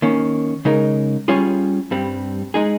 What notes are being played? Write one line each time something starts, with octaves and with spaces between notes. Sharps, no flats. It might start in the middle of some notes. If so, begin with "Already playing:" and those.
D#3 A#3 C#4
C#3 G#3 D#4 A#4
G3 C#4 F4 G#4 C#5
G2 G3 C4
G#3 D#4 G#4